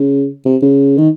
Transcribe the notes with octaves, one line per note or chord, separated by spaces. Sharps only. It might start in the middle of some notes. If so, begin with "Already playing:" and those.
Already playing: C#3
C3
C#3
D#3